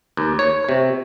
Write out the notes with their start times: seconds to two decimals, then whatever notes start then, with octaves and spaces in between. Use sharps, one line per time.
0.17 D#2
0.39 C#5
0.69 C3